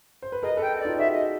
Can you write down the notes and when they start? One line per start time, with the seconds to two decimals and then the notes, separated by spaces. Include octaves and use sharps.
0.22 C5
0.32 B4
0.43 G#4 A#4 D#5
0.57 A4 B4
0.62 G5
0.75 D#5
0.80 D#4 F4 D5
0.98 F#4 G#4 E5
1.12 D#5